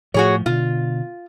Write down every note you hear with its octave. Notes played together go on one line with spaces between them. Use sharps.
A2 F3 F#4 G#4 C#5
B2 D3 F4